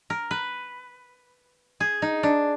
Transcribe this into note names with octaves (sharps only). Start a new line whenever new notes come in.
A#4
B4
G#4
D#4
D4